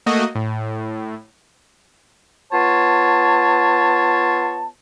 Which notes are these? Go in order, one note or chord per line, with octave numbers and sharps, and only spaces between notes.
A3 A#3 F#4 D#5
A2
B3 F4 C#5 A5